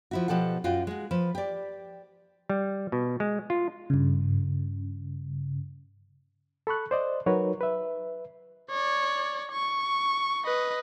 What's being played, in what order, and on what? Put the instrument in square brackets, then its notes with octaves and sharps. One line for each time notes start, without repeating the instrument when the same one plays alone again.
[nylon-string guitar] F3 E4 F#4
B2 F3 G4 A4 F#5
F#2 F4 F#4 G5
G#3 F#4
F3 B4
G4 D5
[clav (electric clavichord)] G3
B2
G#3
F4
[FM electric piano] G2 C#3
[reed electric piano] A4 B5 C#6 F#6
C5 D5 D#5
F#3 D#4 F#4 A#4 B4 C#5
B4 E5
[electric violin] C#5 D5
C#6
B4 D#5